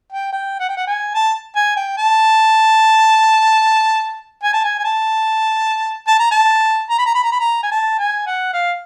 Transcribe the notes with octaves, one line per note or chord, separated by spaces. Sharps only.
G5
G5
F#5
G5
F#5
G#5
A5
G#5
G5
A5
G#5
A5
G#5
G#5
A5
A5
A#5
A5
A#5
B5
A#5
B5
A#5
B5
A#5
G#5
A5
G#5
F#5
F5